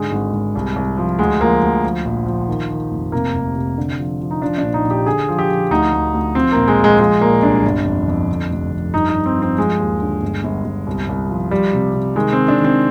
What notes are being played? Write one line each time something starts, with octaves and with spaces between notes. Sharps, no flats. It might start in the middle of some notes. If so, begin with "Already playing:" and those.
Already playing: G#2 D3 G#3
G#1
G#1
C2
C2
F3
D2 G#3
F3 A#3
D2
F3
A#1
F3
D#3
D#3
F1
C3 A#3
F1
C3
D3
F3
F3
D#4
F3 D4
A#1 D4
D#4
A#1
G4
D3 G#4
F3
G4
F3
D2 D#4
D2
D2
F3 C4
A#1 A#3
G#3
F3
G#3
F3 G#3
A#2 A#3
C2 D4
G1
F2
F2
D3
F1
F2
G2 D#4
D#4
G2
C4
F3
C4
F3 G#3
D#2
D3
G1
G1
G1
C2
C2
F3
F3 G3
C3
C3
D#3 G#3
D#3 C4
D4
D#3
C4